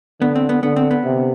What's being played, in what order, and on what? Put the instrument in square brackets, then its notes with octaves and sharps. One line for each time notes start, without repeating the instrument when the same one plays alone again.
[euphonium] D3 [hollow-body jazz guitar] B3
[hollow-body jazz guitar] C4
B3
[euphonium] D3 [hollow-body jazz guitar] B3
[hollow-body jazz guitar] C4
B3
[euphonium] C3